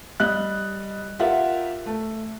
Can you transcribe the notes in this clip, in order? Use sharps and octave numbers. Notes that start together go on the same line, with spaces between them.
G3 D#5 F#6
F4 G4 A#4 E5 F#5
A3